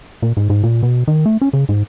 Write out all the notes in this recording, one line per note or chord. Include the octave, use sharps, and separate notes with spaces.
A#2
G#2
G#2
A#2
B2
D#3
A3
C#4
C#3
G#2